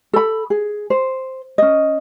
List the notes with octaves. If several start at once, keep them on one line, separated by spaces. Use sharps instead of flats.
A4 B5
G#4
C5
C#4 D#5